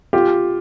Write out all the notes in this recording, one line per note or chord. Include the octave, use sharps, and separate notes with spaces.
F4 G4